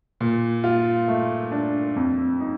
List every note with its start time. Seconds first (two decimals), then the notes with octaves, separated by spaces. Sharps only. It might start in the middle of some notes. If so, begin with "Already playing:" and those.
0.21 A#2
0.64 F4
1.08 A3
1.52 D4
1.96 F2
2.40 D#4